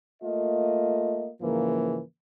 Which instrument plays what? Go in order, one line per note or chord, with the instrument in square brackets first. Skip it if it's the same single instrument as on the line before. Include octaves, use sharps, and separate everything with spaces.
[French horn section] A3 A#3 F4 D#5
G#2 C#3 E3 F3 A#3